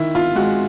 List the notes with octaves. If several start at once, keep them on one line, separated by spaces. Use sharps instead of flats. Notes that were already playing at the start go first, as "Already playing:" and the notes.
Already playing: D#3 E4
F4
G#3 F#4